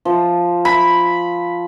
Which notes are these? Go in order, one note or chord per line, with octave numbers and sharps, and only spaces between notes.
F3
B5